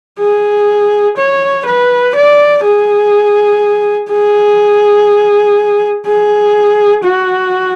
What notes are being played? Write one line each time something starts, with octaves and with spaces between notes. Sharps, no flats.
G#4
C#5
B4
D5
G#4
G#4
G#4
F#4